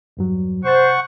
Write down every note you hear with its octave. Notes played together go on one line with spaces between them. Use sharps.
E2 G2 F#3
C3 C5 F#5 C#6 A6